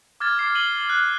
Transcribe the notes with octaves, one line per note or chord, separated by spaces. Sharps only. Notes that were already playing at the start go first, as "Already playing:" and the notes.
D6 F6 G#6 A6
D6 C7
D#7 F#7 G7
F#6